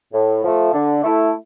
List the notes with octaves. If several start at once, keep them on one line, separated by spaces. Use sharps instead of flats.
A2
F3 A3
D3
A3 E4